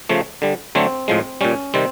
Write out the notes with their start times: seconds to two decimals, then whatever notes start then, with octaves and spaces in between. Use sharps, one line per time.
0.09 C#3 F3 A3
0.42 D3 G3
0.75 D3 F#3 A3 C4
1.08 A2 F3 G#3
1.41 A#2 G3 C#4
1.74 C3 D#3 G3 C4